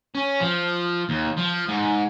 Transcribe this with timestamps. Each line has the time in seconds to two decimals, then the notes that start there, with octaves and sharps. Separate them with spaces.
0.15 C#4
0.41 F3
1.09 D#2
1.37 F3
1.69 G#2